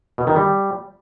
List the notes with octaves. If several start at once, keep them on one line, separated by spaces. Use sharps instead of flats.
B2
D#3
G3